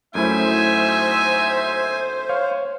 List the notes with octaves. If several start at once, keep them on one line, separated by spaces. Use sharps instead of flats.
F#2 A3 D#4 E4 F#4 C5 E5 G#5
C#5 F5